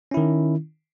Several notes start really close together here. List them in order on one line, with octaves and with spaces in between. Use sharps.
C#4 E4 D#3